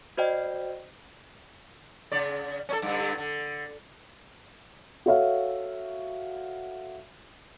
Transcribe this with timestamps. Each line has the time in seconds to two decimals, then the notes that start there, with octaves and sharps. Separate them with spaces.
0.17 F#4 C5 D5 D#5 G5
2.12 C#3 D5
2.69 C#4 D4 A4
2.82 G2 D3
3.18 D3
5.06 F#4 A4 C#5 E5 F5